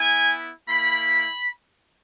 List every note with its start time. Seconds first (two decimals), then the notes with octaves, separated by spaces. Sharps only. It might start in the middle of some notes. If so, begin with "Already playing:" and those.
Already playing: B3 E4 G#5
0.67 A#3 E4 B5